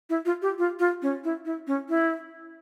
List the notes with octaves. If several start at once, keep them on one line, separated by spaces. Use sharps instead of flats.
E4
F4
G4
F4
F4
C#4
E4
E4
C#4
E4